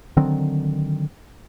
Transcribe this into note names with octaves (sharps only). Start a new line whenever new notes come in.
D3 D#3 F#3 C4